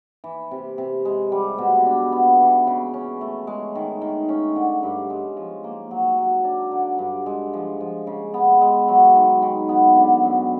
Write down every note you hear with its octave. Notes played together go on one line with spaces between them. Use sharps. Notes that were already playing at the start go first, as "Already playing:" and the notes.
E3
C3
C3
G#3
G3
B2
D4
B3
E3
C#3
C#4
A3
G#3
D#3
D#3
C#4
D3
G2
G#3
F3
A#3
F#3
F#3
D4
D3
G2
G#3
F3
F3
C#3
B3
G#3
F#3
D#3
D#3
B3
D3
F#2